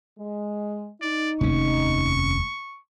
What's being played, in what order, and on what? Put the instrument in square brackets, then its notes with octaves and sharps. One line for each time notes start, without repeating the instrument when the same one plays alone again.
[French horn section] G#3
[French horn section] D#4 [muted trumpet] D5
[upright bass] F1 D#2 [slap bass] C3 C#4 [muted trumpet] C#6